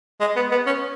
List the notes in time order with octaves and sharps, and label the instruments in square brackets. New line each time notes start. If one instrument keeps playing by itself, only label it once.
[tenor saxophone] G#3
B3
B3
C#4